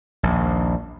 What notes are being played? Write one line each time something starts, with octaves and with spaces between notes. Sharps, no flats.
A#1 D#2